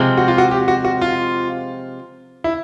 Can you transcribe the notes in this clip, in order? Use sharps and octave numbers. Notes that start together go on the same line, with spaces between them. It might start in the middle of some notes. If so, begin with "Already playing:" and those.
Already playing: C3 F3 G#3 C4
F#4
F4
F#4
G4
F#4
F#4
F4
E4